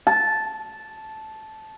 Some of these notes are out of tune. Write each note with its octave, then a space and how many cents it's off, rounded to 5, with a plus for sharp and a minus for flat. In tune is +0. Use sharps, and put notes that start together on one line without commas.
A5 -10